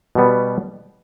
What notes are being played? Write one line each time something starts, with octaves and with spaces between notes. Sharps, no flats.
B2 G3 B3